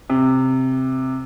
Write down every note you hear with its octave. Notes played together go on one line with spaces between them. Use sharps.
C3